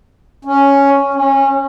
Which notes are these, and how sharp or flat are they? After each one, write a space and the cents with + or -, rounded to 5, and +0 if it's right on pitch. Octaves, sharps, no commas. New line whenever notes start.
C#4 +0
C#4 -25